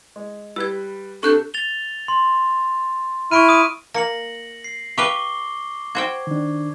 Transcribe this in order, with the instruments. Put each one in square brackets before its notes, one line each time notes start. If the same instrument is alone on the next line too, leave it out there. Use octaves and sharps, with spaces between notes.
[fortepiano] G#3
[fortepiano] G3 B4 [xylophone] E6 G#6
[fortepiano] C3 [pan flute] D4 [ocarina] A4 [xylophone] C#6 F#6 G6
[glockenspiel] A6 F7 G7
C6
[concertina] E4 F6 [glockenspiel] C#6 D7 D#7
[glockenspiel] D#6 D#7
[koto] A#3 [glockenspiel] A#6 C#7 F#7
[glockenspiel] C7
[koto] G4 B4 F5 [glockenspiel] C#6 D6 G7
[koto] F#4 C5 G5 [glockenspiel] G#6
[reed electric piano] D#3 D4